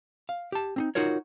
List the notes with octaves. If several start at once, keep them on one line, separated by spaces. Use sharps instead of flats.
F5
G4 A5
C4 D4 D#4
D#4 F4 F#4 A#4 C#5